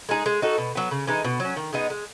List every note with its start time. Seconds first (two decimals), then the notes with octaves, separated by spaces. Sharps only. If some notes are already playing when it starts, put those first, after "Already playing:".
0.09 G#3 D#4 G#4
0.26 G#3
0.42 D#4 F#4 A4
0.58 B2
0.75 F#3 B3
0.91 C#3
1.07 E3 G#3 D#4
1.25 B2
1.40 F#3 C#4
1.56 D#3
1.73 G#3 B3 D#4
1.90 G#3